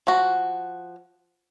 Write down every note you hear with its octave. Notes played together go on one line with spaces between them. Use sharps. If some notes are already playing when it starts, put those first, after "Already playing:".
F3 F#4